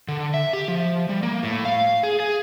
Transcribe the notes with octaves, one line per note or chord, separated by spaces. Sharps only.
D3
E5
G4
F3
G3
A#3
A2
F5
G#4
G#4